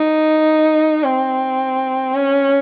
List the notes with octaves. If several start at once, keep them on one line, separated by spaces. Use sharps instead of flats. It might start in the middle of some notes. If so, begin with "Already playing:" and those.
Already playing: D#4
C4
C#4